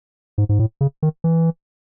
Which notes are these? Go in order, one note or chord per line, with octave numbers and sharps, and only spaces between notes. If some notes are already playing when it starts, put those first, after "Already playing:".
G#2
G#2
A2
C#3
D#3
E3